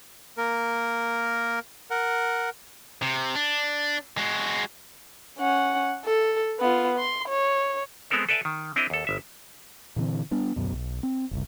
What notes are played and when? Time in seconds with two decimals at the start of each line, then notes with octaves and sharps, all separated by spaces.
0.38 A#3 A#4
1.91 A#4 F#5
3.03 C3
3.35 D4
4.18 G#3 F#4
5.39 C#4 F#5
6.05 A4
6.60 B3 F4
6.99 C6
7.28 C#5
8.10 G#3 B3 C4 A4 A#4 C5
8.29 A4 B4 D5 E5 G#5 A5
8.45 D#3
8.76 C4 D4 E4 A#4 D#5
8.90 D#2 A4
9.07 G1 E5
9.96 A#2 D3 E3 C4
10.31 G3 B3 D4
10.56 D1 A1 F#2 B2
10.73 B1
11.03 C4
11.31 F#1 C2